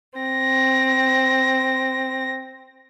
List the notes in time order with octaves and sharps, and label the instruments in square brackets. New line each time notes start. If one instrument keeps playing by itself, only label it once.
[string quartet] C4 A#6